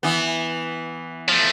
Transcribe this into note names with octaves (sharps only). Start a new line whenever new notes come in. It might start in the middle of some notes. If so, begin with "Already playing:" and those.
E3 B3
F3 A3